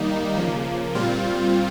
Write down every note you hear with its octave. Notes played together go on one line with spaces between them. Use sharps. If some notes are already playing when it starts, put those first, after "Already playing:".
Already playing: D#3 G3 A#3 D#4
C#3 F3 A#3
A#2 G3 C4 F4